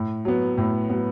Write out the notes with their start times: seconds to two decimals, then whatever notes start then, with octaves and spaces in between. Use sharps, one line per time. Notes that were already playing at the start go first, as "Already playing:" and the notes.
Already playing: A2
0.25 F#3 B3
0.58 A2
0.90 F#3 B3